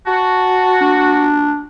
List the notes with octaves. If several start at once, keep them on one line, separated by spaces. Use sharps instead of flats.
F#4 A5
D4